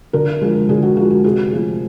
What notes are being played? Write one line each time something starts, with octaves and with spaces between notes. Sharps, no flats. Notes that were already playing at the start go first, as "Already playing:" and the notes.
D3 A#4
F3 G#3
D3 G#4
F#4
F3 G#3 F#4
F#4
C3 G#4
F3 A3